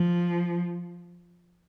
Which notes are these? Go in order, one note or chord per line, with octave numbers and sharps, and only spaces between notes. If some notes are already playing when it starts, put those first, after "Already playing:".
Already playing: F3